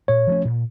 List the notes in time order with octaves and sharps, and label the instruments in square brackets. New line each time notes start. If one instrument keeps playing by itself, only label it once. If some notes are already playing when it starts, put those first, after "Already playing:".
[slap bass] A#2 [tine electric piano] C#5
[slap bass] F3 A3 C#4
A#2